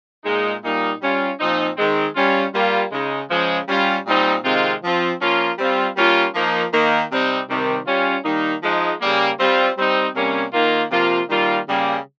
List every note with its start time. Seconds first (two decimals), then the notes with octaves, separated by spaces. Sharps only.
0.24 A#2 G#3 D#4
0.62 A#2 G3 A#3 D#4
1.01 G3 C#4 F4
1.39 A#2 F3 C4 D#4
1.77 D#3 G#3 C4
2.15 G3 C#4 F4
2.53 G3 A#3 F4
2.91 C#3 G#3 D#4
3.30 C#3 F3 G#3
3.68 G3 C#4 F4
4.06 A#2 G3 C4 D#4
4.44 C3 D#3 G#3 C4 F4
4.82 F3 C4 F4
5.20 F3 A#3 C#4 F4
5.58 G3 C4 F4
5.96 G3 A#3 C#4 F4
6.34 F3 A#3 D#4
6.72 D#3 A#3 D#4
7.10 C3 G3 C4 D#4
7.48 C3 D#3 G3
7.86 G3 C#4 F4
8.24 D#3 G3 A#3 D#4
8.62 F3 G#3 D#4
9.01 C#3 G3 A#3
9.39 G3 C4 F4
9.77 G3 C4 D#4
10.15 C3 G3 A#3 C#4
10.53 D#3 A#3 F4
10.91 C3 F3 A#3 F4
11.29 D#3 G3 A#3 F4
11.68 C#3 G3 A#3